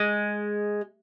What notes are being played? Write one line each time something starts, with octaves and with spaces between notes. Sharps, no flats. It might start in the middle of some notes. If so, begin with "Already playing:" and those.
Already playing: G#3